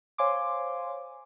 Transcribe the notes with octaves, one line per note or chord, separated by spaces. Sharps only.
C5 C#5 F5 G#5 C6 D6